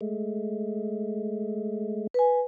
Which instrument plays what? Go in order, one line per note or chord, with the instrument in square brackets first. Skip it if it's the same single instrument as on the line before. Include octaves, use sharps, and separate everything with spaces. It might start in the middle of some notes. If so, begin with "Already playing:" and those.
[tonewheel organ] G#3 A3
[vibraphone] B4 G#5